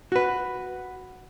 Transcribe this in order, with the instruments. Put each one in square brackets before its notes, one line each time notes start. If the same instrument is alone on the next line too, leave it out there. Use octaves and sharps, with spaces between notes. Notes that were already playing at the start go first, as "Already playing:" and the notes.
[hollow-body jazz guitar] F#4 B4